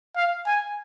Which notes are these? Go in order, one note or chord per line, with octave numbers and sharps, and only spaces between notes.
F5
G#5